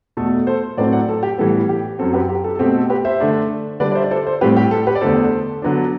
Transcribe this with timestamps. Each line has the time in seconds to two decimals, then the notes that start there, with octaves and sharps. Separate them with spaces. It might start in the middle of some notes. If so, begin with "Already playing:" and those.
0.17 E2 B2 A3 A4
0.47 A4 C5
0.77 A2 F#3 A3 C4 B4 D5
0.92 D5 F#5
1.09 A4
1.23 G4
1.38 A2 E3 G3 B3 A4
1.69 G4
1.99 F#2 F#3 C4 A4
2.13 G4 B4
2.29 G4
2.44 A4
2.55 A4
2.59 B2 A3 C4 G4
2.75 A4
2.90 G4 B4
3.05 C5 E5
3.20 D3 A3 D4
3.80 D3 G3 D4 B4 D5
3.91 D5
3.95 C5 E5
4.04 D5
4.11 A4 C5
4.26 A4 C5
4.41 A2 G3 C4 G4 B4
4.57 G4
4.71 A4
4.87 G4 B4
4.95 D5
5.01 E2 D3 A3 A4 C5
5.62 D3 F#3 B3 D4